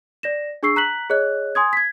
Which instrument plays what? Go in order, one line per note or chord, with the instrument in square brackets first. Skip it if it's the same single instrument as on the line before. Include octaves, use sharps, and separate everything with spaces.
[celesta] D5 A#6 E7
D4 G#4 C#6 E6 C7
A#5 F#6 B6 F#7
G#4 C#5 D#5 F#6
G#5 C6 D#6 G#6
G#6 B6